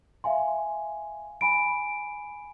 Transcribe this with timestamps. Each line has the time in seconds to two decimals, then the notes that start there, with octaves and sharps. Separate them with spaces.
0.24 E5 F5 G#5 C6
1.41 G#5 B5 D7